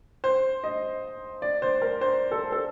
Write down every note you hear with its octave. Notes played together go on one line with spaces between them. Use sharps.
C5
D#5
D5
C5
A#4
C5
A4
A4